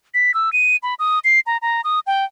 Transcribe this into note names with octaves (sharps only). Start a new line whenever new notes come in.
B6
E6
D#7
B5
D#6
C7
A#5
A#5
D#6
G5